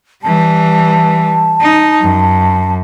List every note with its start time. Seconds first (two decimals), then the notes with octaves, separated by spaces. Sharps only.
0.23 E3 G3 A5
1.61 D#4
2.01 F#2